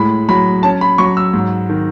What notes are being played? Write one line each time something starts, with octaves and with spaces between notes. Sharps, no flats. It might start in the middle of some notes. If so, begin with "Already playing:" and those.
Already playing: A2 G#3 B5
F#3 B5
C#4 A5
B5
F#3 C#6
E6
G#2
D#3